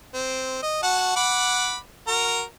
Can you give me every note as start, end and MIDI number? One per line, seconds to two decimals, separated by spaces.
0.14 0.60 60
0.62 0.82 75
0.83 1.14 66
0.83 1.14 78
0.83 1.14 81
1.16 1.77 78
1.16 1.77 83
1.16 1.77 86
2.08 2.43 66
2.08 2.43 70
2.08 2.43 82